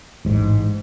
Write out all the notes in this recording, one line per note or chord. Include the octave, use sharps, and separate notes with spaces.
A1 G#2